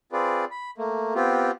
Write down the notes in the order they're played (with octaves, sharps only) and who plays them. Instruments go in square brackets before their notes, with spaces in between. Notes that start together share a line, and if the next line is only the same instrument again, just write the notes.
[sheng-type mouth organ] C4 F4 G#4 B4 D5
B5
A3 A#3
B3 C4 F4 G4